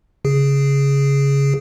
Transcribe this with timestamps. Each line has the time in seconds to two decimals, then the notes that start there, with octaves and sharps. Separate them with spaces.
0.25 C#3 G#4